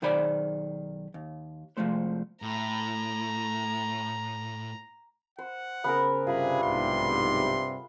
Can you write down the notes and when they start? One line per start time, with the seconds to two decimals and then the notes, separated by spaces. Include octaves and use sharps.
0.02 B1 D#3 G#4 C5 D5 B5
1.14 D#2
1.77 C2 F3 G#3 A3 C5
2.42 A2 A#5
5.39 C5 F#5
5.84 C#3 B3 G#4 A#4 C5
6.27 G2 C3 F4 G#4 B5
6.63 B1 G#2 C6